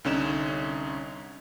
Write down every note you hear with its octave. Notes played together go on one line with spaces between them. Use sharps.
C2 D3 C#4 D#4 E7